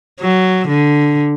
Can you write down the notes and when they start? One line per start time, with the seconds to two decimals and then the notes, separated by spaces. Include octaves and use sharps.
0.20 F#3
0.69 D3